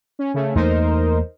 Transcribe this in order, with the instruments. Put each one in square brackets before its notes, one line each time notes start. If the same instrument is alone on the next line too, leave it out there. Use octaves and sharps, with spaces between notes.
[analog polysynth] C#4
C#3 A3 C#4
[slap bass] E2 A3 A#3 [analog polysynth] D#4 A#4 C5